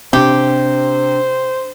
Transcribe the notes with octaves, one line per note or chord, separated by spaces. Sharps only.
C3 C4 D4 G4 C5